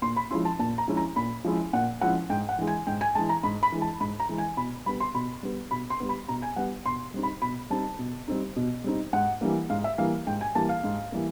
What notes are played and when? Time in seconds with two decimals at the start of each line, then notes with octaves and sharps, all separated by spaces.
0.02 A#2 C6
0.16 B5
0.31 F3 G#3 C#4 E4 C6
0.45 A5
0.59 A#2 A5
0.78 A#5
0.88 F3 G#3 C#4 E4
0.97 A#5
1.16 A#2 B5
1.44 F3 G#3 C#4 E4
1.73 A#2 F#5
2.01 F3 G#3 C#4 E4 F#5
2.30 G#2 G5
2.49 F#5
2.58 E3 G#3
2.67 G#5
2.87 G#2 G5
3.01 G#5
3.15 E3 G#3 A5
3.29 A#5
3.44 G#2 B5
3.63 B5
3.72 E3 G#3
3.82 A5
4.00 G#2 B5
4.20 A#5
4.29 E3 G#3
4.38 G#5
4.57 B2 B5
4.86 G3 B3 B5
5.00 C6
5.14 B2 B5
5.43 G3 B3
5.71 B2 B5
5.90 C6
6.00 G3 B3
6.09 B5
6.28 B2 A#5
6.42 G#5
6.56 G3 B3 F#5
6.85 B2 C6
7.14 G3 C4 D#4
7.23 B5
7.42 B2 B5
7.70 G3 C4 D#4 A5
7.99 B2
8.28 G3 C4 D#4
8.56 B2
8.84 G3 C4 D#4
9.13 G#2 F#5
9.41 E3 G3 A#3
9.70 G#2 F5
9.84 E5
9.98 E3 G3 A#3 F5
10.27 G#2 G5
10.41 G#5
10.55 E3 G3 A#3 A5
10.69 F5
10.84 G#2
11.12 E3 G3 A#3